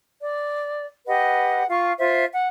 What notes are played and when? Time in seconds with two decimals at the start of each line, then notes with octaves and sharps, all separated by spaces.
0.22 D5
1.07 G4 B4 D#5 F#5
1.68 F4 F5 C#6
1.98 F4 C5 E5
2.33 F#5